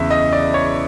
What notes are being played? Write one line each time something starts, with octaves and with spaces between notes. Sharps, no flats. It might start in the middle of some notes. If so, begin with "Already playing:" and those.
Already playing: E2 C#3 E3 E5
D#5
D5
C#5